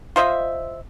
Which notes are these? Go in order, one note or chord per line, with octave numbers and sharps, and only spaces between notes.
F4 C5 D#5 E5